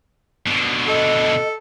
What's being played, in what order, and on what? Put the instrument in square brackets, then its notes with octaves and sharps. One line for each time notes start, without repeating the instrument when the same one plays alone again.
[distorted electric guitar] B2 D3
[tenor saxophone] A4 [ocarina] D#5